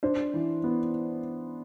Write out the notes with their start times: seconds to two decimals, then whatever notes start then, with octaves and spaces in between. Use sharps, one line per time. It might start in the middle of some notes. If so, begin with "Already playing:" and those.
0.03 D4 C5
0.34 E3
0.64 B3